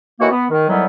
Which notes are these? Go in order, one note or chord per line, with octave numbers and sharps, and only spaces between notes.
A2 D#3 E3 A#3 F#4
B3
D#3
A2 D#3 E3 F#3 G3 B3